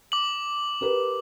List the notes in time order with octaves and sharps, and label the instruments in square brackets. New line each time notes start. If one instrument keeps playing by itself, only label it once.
[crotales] D6 F#7
[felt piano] G4 A#4 B4